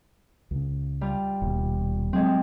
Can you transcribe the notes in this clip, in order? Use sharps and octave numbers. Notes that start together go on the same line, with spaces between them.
C#2 C#3
G3 F4
D#1 B2
F#3 G#3 C4